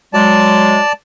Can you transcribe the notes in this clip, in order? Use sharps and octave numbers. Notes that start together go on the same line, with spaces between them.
F#3 G#3 D5 A5